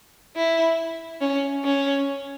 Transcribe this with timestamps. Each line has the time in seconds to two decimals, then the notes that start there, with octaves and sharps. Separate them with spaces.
0.36 E4
1.21 C#4
1.64 C#4